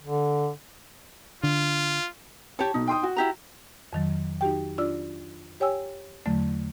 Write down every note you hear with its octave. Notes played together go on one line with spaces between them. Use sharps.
D3
D3 F4
G4 C#5 A5
B1 B2 D#4
G5 C6 D#6
F#4
E4 G4 A#5
F2 D#3 F#3
D#4 F#4 G4 G5
D4 F4 D5 E6
G4 C#5 G5 G#5 E6
E2 D3 F#3 A3